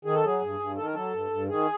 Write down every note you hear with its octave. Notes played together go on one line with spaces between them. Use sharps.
D#3 G#4
A4
F#3 G#4
G2
G2
D#3 A4
A#4
F#3 A4
G2
G2
D#3 G#4